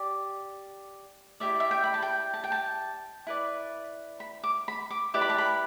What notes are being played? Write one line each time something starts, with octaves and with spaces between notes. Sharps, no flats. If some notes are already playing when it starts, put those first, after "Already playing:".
Already playing: G4 D5
E4 G4 D5 E5
E5
G5
B5
A5
G5
A5
G5
A5
E4 B4 D5
B5
D6
B5
D6
E4 G4 B4 D5 D6
B5
A5
B5